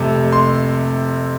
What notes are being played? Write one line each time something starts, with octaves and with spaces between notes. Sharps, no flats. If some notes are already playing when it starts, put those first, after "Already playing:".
Already playing: F1 F2 C3 A3
C6